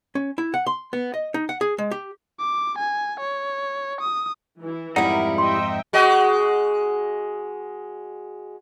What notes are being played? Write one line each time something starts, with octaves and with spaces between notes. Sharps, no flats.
C#4
E4
F#5
C6
B3
D#5
D#4
F#5
G#4
G#3
G4
D6
G#5
C#5
D#6
E3 E4
F2 G#2 G3 D#4 E4 A#4 F#5
D#5 E5 G5 C6
G#3 F#4 D#5